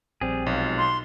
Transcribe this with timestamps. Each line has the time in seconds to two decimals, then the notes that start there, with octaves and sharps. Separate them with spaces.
0.21 A#1 G3 C4 G#4
0.46 B1 G#3 F4
0.78 C6